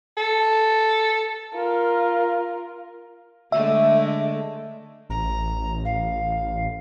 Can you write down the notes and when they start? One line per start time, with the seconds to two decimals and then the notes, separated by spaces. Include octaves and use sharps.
0.17 A4
1.54 F4 A#4
3.52 D3 G#3 A3 E5
5.10 A1 A#5
5.84 F5